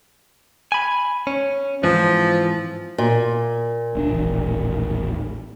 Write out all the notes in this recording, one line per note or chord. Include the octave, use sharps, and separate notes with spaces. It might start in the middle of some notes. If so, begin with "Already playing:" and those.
G#5 B5
C#4
G#2 E3 F3 C4
A#2
D1 C#4 D4
D#1 A1